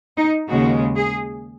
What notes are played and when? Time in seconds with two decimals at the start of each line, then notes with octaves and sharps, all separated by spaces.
0.16 D#4
0.48 D#2 C#3 G#3 F#4
0.95 G#4